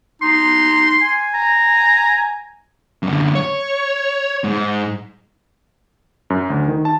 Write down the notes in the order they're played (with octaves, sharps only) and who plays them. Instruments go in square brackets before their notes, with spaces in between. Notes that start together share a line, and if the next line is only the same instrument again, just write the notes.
[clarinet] D#4 [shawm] C6
[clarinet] G#5
[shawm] A#5
[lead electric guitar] F#2 D3
C#5
G#2
[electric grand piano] F#2
D2
D#3
A5